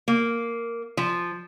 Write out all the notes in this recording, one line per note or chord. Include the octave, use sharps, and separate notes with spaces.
A#3
F3